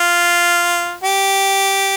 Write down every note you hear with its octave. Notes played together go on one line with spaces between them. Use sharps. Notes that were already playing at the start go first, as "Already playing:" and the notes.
Already playing: F4
G4